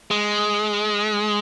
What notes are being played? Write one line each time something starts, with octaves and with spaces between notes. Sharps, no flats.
G#3